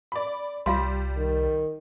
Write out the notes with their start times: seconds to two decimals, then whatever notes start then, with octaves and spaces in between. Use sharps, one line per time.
0.12 D5 B5
0.66 C2 G3 F4 F5 C6
1.17 D#3